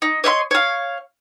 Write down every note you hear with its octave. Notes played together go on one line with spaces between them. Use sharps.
D#4
C#5 D#5 E5 C6
C#5 F5